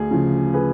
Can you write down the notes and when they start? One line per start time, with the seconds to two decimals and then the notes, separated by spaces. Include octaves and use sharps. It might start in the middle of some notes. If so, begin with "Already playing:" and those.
Already playing: D2 G#4
0.11 C#3 F3
0.54 G#4 B4